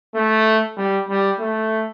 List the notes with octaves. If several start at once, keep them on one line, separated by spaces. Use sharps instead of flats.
A3
G3
G3
A3